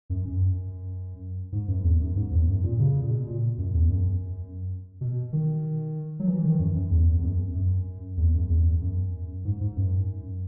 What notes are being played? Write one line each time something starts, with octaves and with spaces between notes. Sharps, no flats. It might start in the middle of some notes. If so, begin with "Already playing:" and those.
F#2
F#2
G#2
F#2
E2
F#2
G#2
E2
F#2
A#2
C#3
A#2
B2
A#2
F#2
E2
F#2
B2
D#3
F#3
E3
D#3
F#2
F#2
E2
E2
F#2
F#2
E2
F#2
E2
F#2
G#2
G#2
F#2